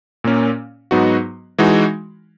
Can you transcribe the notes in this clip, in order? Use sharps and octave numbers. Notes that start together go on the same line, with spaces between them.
A#2 A#3 C#4
G#2 F#3 B3 D#4 F#4
E3 G#3 D#4 F#4